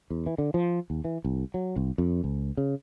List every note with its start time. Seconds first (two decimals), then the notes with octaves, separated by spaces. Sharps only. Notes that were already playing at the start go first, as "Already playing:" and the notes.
0.10 E2
0.26 E3
0.38 D3
0.54 F3
0.90 D#2
1.05 E3
1.25 C2
1.54 F#3
1.76 C2
1.98 F2
2.24 C#2
2.57 C#3